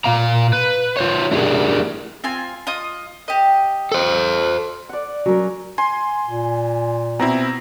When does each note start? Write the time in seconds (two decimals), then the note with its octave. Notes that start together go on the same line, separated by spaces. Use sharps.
0.04 A#2 F5 A#5
0.53 B4
0.97 F4 C5 C#5
1.31 A3 D4 E4 G4 G#4 A#4
2.24 C4 F4 G#5
2.67 F4 D#5 D#6
3.28 G4 D#5
3.92 A4 C5
4.89 D5 F#5
5.26 F#3 C#4 A#4
5.78 G#5 C6
6.27 A#2
7.19 B2 C4 E4 A#5